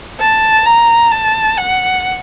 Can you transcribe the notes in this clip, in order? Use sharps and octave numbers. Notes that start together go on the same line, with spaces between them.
A5
A#5
A5
F#5